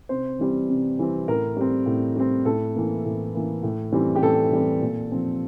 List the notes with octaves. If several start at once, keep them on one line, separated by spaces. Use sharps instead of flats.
C3 C5
E3 G3 C4
C3
E3 G3 C4
A2 A#4
G3 C4
A2
G3 C4
A2 A4
E3 A#3
A2
E3 A#3
A2
E3 G3 C4
G4
A2 A4
E3 G3 C4
A#2
F3 C4